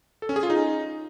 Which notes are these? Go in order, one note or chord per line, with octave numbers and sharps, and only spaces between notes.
A4
C#4
G#4
F4
D#4